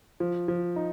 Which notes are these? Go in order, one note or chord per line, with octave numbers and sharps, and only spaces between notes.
F3
F3
D#4